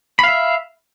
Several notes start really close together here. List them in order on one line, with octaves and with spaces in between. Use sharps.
B5 F5 E5